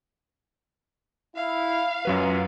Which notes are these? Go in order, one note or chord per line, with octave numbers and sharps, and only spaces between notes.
E4 F5
F#2 F#3 F4 B4